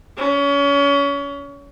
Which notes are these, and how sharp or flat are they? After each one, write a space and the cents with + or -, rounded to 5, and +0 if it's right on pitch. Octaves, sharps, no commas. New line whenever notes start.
C#4 +30